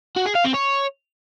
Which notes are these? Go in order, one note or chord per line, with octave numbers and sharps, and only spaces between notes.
F#4
G#4
F5
C4
C#5